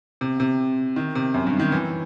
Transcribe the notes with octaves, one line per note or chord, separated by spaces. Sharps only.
C3
C3
D#3
C3
F#2
G2
D#3
E3